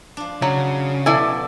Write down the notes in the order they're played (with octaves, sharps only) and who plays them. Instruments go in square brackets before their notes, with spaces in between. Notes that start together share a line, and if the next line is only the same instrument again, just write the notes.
[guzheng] F3 D4
[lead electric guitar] C#3 [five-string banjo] F#3
[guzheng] B2 F3 [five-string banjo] E4 G#5 [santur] A4 D5